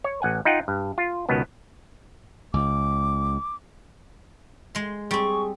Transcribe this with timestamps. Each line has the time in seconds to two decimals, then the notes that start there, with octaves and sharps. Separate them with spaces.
0.04 C#5
0.22 A1 F#5 G#5
0.45 D#4 F4 F#5 G5
0.68 G2
0.98 F4
1.29 C#2 B2 D#3 B3
2.54 C#2 D6
4.75 G#3 C6
5.11 G3 C4 G#4 C#6